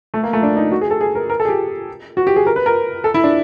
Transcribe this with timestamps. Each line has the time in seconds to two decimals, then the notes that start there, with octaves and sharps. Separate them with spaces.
0.14 A3
0.23 A#3
0.33 A3
0.43 D4
0.57 D#4
0.72 F#4
0.81 G#4
0.91 A4
1.01 G#4
1.15 A#4
1.30 A#4
1.40 A4
1.45 G#4
1.49 G4
2.17 F#4
2.27 G4
2.36 G#4
2.46 A#4
2.56 B4
2.66 A#4
3.04 A4
3.14 E4
3.24 D4